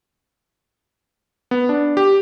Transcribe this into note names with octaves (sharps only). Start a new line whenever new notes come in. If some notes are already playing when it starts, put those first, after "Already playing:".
B3
D4
G4